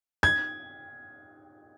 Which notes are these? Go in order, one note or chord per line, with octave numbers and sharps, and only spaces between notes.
G#6